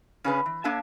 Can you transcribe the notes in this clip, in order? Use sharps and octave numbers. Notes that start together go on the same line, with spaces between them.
C#3 C#4 D4 G#4 A#4 B4
E3
A#3 D4 A4 C#5 E5 A5